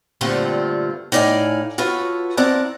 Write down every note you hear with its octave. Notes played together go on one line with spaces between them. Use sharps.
G2 A#2 D3 A3 C4 F4
A2 D#4 D5 F5 G#5
F4 F#4 A4 B4 C#5
C4 E4 A#4 D5 F#5 A5